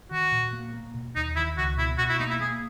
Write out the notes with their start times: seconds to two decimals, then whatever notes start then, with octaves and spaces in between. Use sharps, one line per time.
0.11 D#3 F#4
0.32 A#2
0.53 A#3
0.74 A#3
0.94 B2
1.15 D#2 D#4
1.36 D#3 E4
1.57 C#2 F#4
1.77 B2 E4
1.98 B2 F#4
2.09 E4
2.19 A#3 D#4
2.30 E4
2.40 A#3 G#4